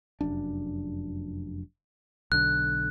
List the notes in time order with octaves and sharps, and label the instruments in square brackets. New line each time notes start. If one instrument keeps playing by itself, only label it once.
[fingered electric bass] F1 F#2 D4
[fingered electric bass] B1 D3 [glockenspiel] F#6